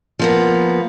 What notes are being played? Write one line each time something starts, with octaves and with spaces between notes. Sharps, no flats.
F3 A#3 B3